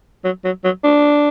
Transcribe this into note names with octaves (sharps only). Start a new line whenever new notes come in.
F#3
F#3
F#3
D4